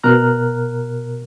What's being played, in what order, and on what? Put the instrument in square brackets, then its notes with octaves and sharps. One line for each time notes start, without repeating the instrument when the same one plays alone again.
[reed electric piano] B2 A#4 A#5 F6 F#6